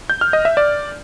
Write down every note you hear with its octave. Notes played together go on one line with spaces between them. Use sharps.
G6
F6
D#5
E5
D5